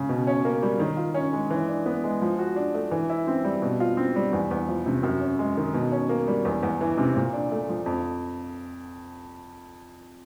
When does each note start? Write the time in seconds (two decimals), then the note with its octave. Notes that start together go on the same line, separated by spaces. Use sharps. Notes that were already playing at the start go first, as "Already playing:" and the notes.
Already playing: C#3
0.09 B2
0.27 C#4
0.45 A#3
0.63 G3
0.80 D#3
0.97 F4
1.14 C#4
1.33 G#3
1.50 E3
1.68 D4
1.86 B3
2.04 G#3
2.22 F3
2.39 F#4
2.56 D4
2.74 A3
2.91 E3
3.10 E4
3.27 C4
3.44 G3
3.62 B2
3.80 F4
3.97 C4
4.16 G3
4.33 E2
4.51 E2
4.68 F3
4.86 C3
5.03 F#2
5.21 C#4
5.39 G#3
5.57 D#3
5.74 B2
5.92 C#4
6.09 A#3
6.28 G3
6.45 E2
6.63 E2
6.81 E3
6.98 C3
7.16 A#2
7.33 D4
7.52 A3
7.69 F3
7.86 F2